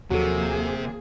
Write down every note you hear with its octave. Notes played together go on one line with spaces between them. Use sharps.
D#2 C3 F3 F#3 A#3 G#4 A4